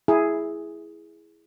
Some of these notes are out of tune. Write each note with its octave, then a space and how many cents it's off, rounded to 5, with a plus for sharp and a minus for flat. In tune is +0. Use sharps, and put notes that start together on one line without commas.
E4 +0 G#4 +0